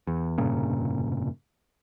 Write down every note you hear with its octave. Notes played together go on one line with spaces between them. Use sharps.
E2
F1 G2 A#2 C#3